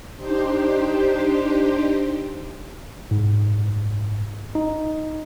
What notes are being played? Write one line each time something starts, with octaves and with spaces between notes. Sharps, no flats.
D4 D#4 G4 C5
G#2
D#4